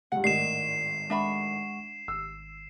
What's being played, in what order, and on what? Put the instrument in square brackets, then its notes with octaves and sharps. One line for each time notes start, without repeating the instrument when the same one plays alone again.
[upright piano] C#2 G2 [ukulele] F#5
[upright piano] G#1 A2 D#3 [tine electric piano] D5 [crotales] C7 E7
[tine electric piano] G#3 F#5 C#6 [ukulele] D4 E5 B5
[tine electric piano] G#1 [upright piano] E6